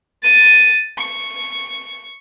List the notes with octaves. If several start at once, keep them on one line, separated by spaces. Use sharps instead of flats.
A6 D#7
C#6